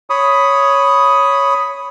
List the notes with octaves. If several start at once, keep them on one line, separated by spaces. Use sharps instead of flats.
C#5 B5 D#6